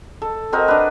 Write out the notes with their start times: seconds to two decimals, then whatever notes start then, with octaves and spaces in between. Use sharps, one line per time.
0.22 A4
0.52 C4 F#4 A#4 D#5
0.68 D4 B4